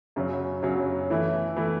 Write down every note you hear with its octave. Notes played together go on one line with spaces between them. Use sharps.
F#2 C#3 F#3 C#4
F#2 C#3 F#3 C#4
E3 A3 E4
E3 A3 E4